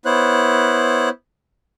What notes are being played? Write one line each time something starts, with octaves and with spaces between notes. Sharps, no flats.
B3 E4 C5 C#5 F#6